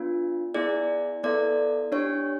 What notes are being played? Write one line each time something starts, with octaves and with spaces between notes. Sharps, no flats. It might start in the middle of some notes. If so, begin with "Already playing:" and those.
Already playing: B3 D4 F4
B3 E4 G#4 D5
B3 E4 A4 D5
D4 G4 C#5